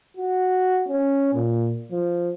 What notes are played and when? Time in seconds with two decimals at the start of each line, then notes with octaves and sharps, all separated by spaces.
0.17 F#4
0.88 C#4
1.34 A#2
1.91 F3